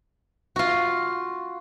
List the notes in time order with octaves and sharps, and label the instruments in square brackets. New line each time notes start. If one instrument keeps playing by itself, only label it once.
[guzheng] F4 F#4